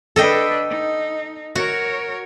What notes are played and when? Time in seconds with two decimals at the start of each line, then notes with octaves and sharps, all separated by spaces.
0.16 D4 A4 B4 D#5 G5
0.70 D#4
1.55 F#4 A#4 C#5